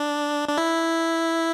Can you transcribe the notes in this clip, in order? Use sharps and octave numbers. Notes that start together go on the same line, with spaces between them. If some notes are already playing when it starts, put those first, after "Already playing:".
Already playing: D4
D4
E4